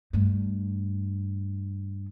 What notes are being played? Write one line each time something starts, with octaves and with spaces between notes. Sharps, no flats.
G2 A3